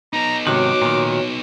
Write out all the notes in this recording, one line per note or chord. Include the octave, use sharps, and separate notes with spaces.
B3 D#4 A#5
G#2 C3 D#3 F#4 C#5 D6
A#2 D#3